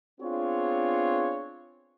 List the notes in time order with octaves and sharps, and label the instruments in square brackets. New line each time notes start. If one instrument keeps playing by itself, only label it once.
[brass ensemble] B3 C4 D4 F4 G#4 C#5